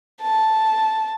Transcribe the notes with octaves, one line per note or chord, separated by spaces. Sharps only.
A5